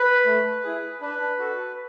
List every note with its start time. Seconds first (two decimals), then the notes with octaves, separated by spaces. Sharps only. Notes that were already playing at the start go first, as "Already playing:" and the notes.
Already playing: B4
0.26 A3
0.63 E4 G#4
1.01 D4 B4
1.39 F#4 A4